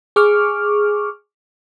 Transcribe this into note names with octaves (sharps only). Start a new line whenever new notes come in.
G#4 C#6 D6 F6